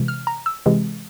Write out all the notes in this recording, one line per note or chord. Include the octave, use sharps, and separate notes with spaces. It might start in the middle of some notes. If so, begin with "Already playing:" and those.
Already playing: C3 E3 G#3
F6
A#5
E6
C3 E3 G#3